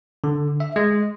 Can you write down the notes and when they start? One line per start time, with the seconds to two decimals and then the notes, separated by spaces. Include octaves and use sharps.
0.24 D3
0.60 E5
0.76 G#3